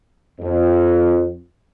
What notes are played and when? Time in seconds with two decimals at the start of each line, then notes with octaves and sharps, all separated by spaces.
0.40 F2